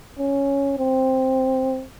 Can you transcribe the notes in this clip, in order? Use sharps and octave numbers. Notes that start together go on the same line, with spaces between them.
C#4
C4